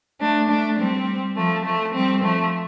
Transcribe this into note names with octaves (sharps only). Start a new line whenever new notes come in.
A3 D4
A3 D4
G3 C4
F3 A3
F3 A3
G3 C4
F3 A3